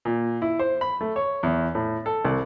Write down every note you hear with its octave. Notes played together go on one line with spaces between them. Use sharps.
A#2
E4
C5
B5
A3
C#5
E2
A2
A4
C2